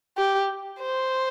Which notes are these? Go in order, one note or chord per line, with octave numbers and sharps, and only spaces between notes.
G4
C5